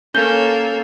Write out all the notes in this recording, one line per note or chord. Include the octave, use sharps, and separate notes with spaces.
A#3 C#4 A4 G6 G7